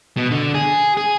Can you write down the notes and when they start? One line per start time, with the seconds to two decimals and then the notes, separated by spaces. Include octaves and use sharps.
0.17 B2
0.31 D3
0.55 G#4
0.97 G#4